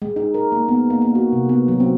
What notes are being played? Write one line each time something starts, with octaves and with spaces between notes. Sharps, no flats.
G#3
D#4
A#4
A#3
B3
A#3
A#3
F#4
C3
B3
F#3
C4